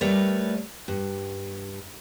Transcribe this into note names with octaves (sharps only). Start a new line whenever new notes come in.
G3 A3 A#4 B4 C#5 D5
G2